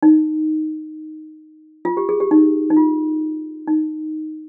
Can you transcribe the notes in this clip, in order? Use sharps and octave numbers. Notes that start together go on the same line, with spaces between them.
D#4
F4
G4
G#4
G4
D#4
D#4
F4
D#4